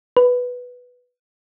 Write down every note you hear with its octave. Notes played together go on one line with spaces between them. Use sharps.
B4